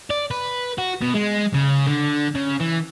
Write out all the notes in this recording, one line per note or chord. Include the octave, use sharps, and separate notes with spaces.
D5
B4
F#4
B2
G#3
C#3
D3
C#3
E3